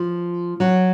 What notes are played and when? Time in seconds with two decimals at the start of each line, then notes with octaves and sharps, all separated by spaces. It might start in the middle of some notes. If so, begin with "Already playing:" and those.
Already playing: F3
0.60 F#3